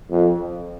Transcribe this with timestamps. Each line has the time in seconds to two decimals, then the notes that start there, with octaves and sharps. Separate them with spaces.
0.11 F2